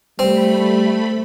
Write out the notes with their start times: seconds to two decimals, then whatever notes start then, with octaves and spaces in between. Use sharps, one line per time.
0.19 G3 A3 C4 B5